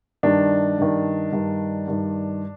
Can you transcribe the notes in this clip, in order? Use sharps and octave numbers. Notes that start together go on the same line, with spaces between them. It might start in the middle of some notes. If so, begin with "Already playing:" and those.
G2 D#3 D4
G2 D#3
G2 D#3
G2 D#3